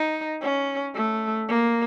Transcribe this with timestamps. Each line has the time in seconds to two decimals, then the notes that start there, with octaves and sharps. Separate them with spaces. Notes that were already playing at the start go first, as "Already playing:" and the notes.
Already playing: D#4
0.42 C#4
0.95 A3
1.49 A#3